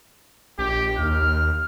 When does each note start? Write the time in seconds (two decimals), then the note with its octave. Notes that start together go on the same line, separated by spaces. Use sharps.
0.59 A#1 G4
0.98 D#2 F6